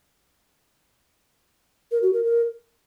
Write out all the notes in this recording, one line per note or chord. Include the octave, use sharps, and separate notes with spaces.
A#4
F#4
A#4
A#4